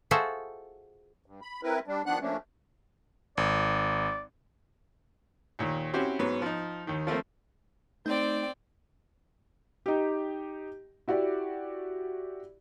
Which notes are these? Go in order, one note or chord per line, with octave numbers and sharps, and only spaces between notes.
F4 F#4 G#4 A4 C5 E5
G2
B5
C4 E4 A#4 B4
G3 D4
D#3 F3 B3 D4 F#5 F#6
F3 A3 A#3 C#4 D4
G#1 D5
D#2 A#2 D#3
C4 C#4 E4 F#4 G4 C5
G#2 F#3 B3
F3 D#4
D#2 D#3
F3 A3 A#3 C4
A3 C4 D#4 D5 G5 G6
D#4 G4
E4 F#4 G4 D5